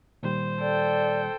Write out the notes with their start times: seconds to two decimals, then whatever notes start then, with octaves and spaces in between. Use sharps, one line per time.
0.23 A#2 D#3 G3 C5
0.61 A4 D5 G5